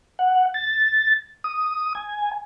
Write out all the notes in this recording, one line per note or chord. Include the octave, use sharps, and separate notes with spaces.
F#5
A6
D#6
G#5